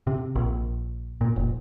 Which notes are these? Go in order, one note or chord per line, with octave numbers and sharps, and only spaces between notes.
C3
A#1
A#2
F1